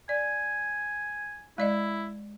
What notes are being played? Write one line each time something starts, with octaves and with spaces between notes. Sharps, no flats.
D5 G#5
G#3 E4 D5 D#5